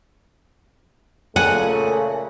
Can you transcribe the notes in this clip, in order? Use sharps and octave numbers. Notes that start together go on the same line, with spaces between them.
A#2 C#3 A3 F#5 G#5